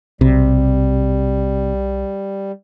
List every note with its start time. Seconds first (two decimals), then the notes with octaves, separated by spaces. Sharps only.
0.21 B1 C3 G3